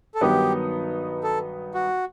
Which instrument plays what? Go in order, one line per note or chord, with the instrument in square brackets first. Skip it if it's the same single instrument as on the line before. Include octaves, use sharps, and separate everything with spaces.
[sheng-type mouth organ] A4
[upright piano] G2 D#3 F#3 B3 D#4 [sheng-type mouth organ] G4
[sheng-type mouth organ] A4
F#4